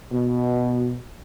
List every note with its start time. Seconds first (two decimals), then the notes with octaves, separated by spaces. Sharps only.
0.12 B2